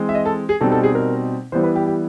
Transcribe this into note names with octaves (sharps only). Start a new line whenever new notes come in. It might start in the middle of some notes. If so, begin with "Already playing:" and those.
Already playing: E3 G#3 C4
E5
D#5
A4
G#4
B2 G3 C4 D#4 A4
A4
G#4
A#4
E3 G3 B3 E4 C5
B4
G4
G4